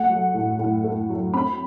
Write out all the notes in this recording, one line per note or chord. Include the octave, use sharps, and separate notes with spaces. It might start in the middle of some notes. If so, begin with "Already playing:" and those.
Already playing: A3 F#5
F#3
A2
A2
A3
F#3
C4 B5